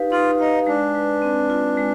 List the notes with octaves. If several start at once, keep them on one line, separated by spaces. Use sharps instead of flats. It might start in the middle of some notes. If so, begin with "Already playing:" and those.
Already playing: D#4 G4 B4 F5
D#4 F4
D#4 F5
G#3 D4
B4
C4
F4
G#3